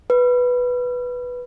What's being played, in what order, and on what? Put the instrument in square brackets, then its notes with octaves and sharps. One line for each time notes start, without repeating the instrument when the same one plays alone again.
[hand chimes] B4